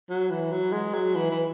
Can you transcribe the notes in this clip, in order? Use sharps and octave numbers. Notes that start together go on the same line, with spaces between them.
F#3
E3
F#3
G#3
F#3
E3
E3